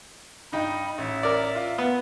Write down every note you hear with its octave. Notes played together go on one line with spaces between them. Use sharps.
G2 D#4 G5 B5
A1 E5
A#4 D5
F4
B3